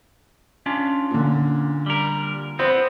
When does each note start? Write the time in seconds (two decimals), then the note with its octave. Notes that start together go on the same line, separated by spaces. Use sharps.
0.66 C#4 D4 F4
1.11 A#2 D3
1.86 G3 A#4
2.59 B3 C4 C5